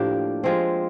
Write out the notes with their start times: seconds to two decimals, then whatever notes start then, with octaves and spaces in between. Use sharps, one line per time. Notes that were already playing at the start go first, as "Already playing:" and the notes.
Already playing: A2 F3 A#3 D4 G4
0.44 F3 G#3 C4